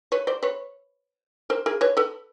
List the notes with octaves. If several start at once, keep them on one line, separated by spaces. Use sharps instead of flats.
B4 C#5
C5 D5
B4 C#5
A#4 C5
G#4 A#4
B4 C#5
A4 B4